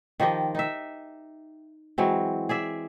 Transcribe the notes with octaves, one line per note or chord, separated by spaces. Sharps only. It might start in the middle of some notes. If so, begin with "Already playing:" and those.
D#3 F3 G4 D#5
D#4 E5
E3 F#3 G#3 C4
G#4 D5 E5